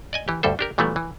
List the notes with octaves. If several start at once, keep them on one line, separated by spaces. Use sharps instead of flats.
D5 D#5 G#5
E3 G4
D2 G2 G3 A4 C5
D4 G4 A#4
A#2 E3 F#3 G3 A3 B3
E3